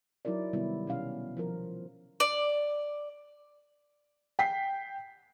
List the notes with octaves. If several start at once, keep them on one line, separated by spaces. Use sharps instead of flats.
F#3 D#4 E4 A#4 D5
C3 D#3 G3 B3 E4
B2 C#4 F5
F3 F4 A#4
D5
G5 B6 C7